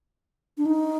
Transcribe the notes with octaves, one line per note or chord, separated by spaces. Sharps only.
D4
D#4